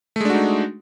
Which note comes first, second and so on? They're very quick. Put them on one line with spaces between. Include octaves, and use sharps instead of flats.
A3 G#3 D4 F#4 D#4